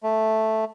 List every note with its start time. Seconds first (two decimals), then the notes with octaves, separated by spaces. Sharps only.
0.03 A3